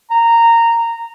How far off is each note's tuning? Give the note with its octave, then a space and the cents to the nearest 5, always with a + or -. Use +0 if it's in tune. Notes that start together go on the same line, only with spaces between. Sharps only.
A#5 -15